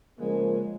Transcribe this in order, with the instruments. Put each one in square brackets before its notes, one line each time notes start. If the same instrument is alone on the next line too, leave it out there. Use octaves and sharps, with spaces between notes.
[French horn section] C#3 F3 A#3 [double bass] G#3